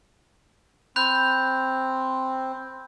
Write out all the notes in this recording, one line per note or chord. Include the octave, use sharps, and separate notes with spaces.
C4 B5 F#6 G6